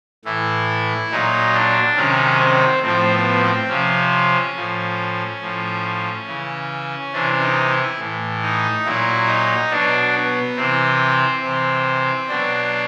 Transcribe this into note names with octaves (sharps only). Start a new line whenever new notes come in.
A2 E3 E4
A#2 F#3 D#4
D4
C3 D#3 F#3 C#4
C4
A2 F3 C4
B3
C4
C3 F3 C#4
A2 F3
A2 F3
C#3 E3
C3 E3 D4
D#4
E4
A2 E3
D#4
A#2 F#3 E4
D#4
B2 F#3 D4
B3
C3 E3 C4
C3 E3
B2 F#3 D4